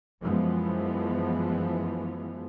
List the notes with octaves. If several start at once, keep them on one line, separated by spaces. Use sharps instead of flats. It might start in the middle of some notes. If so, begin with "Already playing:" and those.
F#2 E3 F3 G#3 B3